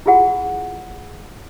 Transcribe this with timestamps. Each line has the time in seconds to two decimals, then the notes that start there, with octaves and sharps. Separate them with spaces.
0.06 E4 F4 G#4 F#5